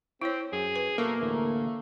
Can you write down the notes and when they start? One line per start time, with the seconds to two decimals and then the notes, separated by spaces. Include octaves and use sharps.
0.21 C4 E4 C#5
0.52 F#2 G#4
0.76 B4
0.98 B2 A3 A#3
1.21 A1 D2 A3 E4